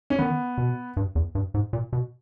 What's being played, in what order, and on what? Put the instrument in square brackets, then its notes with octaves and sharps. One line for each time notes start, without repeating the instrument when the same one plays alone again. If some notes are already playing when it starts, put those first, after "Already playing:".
[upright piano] C#4
[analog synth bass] D#3 [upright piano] B3
[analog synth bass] B2
G2
E2
G2
G#2
A#2
B2